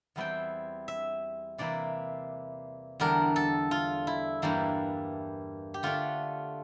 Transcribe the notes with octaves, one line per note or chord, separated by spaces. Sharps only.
E2 E3 G3 C4 E4 G5
E5
C3 E3 A#3 E4 D5
E2 D3 G3 D4 A#4
A4
F4
E4
G2 E3 G3 A#3 E4
G4
D3 A3 D4 F4